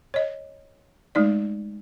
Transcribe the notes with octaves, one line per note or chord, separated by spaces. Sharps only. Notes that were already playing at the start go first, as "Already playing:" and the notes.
C#5 D#5
G#3 A3 D#4 D5